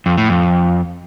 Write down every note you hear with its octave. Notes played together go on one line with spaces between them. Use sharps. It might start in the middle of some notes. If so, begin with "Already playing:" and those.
F2
A2
F2